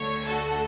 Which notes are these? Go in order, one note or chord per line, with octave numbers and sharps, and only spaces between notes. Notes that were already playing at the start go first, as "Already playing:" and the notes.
Already playing: D2 D3 A3 C#5
F#4 A4